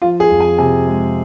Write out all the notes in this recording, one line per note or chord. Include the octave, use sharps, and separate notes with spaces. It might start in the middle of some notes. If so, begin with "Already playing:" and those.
F3 F4
G#4
F2
G#5
C3 G#5
G#3